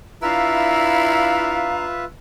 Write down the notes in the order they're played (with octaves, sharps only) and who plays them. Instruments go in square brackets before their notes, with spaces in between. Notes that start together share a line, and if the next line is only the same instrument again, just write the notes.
[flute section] D4 F5 A#5 [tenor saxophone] E4 [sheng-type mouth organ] F4 B4 E5